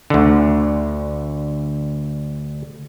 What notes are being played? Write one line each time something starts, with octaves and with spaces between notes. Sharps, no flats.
D2 D3